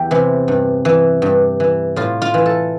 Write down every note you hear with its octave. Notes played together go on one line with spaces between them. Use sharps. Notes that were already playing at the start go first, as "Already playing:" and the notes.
Already playing: E2 G4
C3 E3
G2
E3
G2
E3
A2 F4
F4
E3
A4